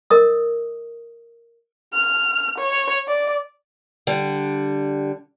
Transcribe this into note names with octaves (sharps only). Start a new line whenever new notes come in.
A#4 D#5 D#6
F6
C#5
D5
D3 G3